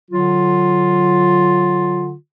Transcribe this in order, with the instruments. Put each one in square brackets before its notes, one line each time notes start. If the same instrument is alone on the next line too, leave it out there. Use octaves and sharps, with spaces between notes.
[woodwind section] D3 F#3 F4